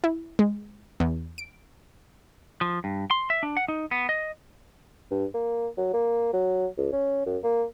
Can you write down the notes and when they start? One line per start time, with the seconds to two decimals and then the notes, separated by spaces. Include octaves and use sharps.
0.04 E4
0.39 G#3
1.00 E2
1.38 D7
2.61 F3
2.84 G2
3.11 C6
3.30 E5
3.43 D4
3.57 F#5
3.68 D#4
3.91 B3
4.09 D#5
5.11 G2
5.34 A#3
5.77 F#3
5.93 A#3
6.33 F#3
6.78 C#2
6.92 C#4
7.26 F#2
7.43 A#3